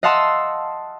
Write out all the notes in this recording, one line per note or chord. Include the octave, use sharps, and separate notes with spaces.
D#5 F5 F#5 A5 C6 E6